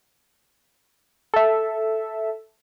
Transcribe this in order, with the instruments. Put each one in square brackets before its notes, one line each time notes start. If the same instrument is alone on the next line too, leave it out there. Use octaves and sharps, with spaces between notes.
[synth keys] A4 E5